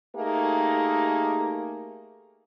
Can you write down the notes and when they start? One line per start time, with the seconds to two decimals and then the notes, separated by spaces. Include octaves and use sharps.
0.16 A3 A#3 D#4 G4 G#4 A#4